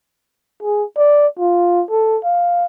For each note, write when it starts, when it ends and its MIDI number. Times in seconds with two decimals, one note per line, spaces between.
0.62 0.84 68
0.97 1.27 74
1.39 1.83 65
1.90 2.18 69
2.23 2.65 77